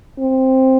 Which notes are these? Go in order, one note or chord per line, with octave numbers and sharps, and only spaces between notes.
C4